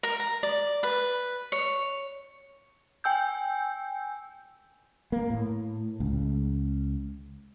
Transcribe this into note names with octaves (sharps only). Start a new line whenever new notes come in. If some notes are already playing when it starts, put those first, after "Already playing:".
A#4
A#5
D5
B4
C#5
G5 G#5 E6 G6
A#3
A2
C#2